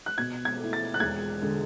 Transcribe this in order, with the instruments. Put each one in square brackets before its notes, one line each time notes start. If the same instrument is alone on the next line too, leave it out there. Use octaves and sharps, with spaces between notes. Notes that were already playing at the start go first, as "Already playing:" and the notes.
[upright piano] F#6
[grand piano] B2 [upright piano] G#6
[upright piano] G#6
[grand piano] A3 E4
[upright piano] A6
F#6
[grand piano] E1 [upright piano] G#6
[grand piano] D3 G#3